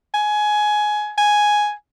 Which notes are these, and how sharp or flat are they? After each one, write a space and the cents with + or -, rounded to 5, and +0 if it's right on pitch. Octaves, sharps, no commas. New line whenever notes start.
G#5 +15
G#5 +5